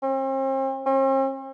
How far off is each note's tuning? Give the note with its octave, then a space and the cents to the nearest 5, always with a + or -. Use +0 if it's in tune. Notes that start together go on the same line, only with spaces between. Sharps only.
C4 +40
C4 +45